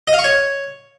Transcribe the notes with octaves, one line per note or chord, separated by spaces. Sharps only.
D#5
F5
C#6
C#5